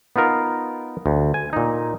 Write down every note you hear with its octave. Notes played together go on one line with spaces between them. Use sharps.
B3 D#4 F4 A#4
D2
G#5
A#2 D#4